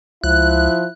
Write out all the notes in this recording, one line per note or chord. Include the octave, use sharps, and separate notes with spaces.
C#2 F3 E4 F#6